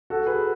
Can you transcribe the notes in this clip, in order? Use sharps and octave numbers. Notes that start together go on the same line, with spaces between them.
F#4 A4
G#4 B4